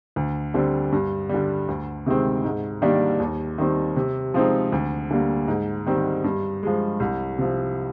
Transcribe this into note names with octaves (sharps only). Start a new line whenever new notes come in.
D2
D3 G3 C4
G2
D3 G3
D2
C3 D#3 G#3 C4
G#2
D#3 G3 A#3 D4
D#2
D#3 G3 C4
C3
F3 G#3 C4 D#4
D2
D3 G3 A#3
G#2
D#3 G3 C4
G2
F3 G#3
C2
C3 F3